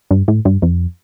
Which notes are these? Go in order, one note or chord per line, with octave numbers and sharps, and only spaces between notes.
G2
A2
G2
F2